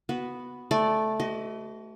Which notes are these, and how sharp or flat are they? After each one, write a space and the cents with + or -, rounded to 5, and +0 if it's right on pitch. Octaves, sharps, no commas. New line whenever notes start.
B3 +0 F#4 +0 B4 +0
A3 -10 D5 +0
F#4 +45 B4 +40 D#5 +0